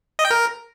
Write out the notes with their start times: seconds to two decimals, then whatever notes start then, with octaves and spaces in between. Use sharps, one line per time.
0.19 D#5
0.25 G5
0.30 A#4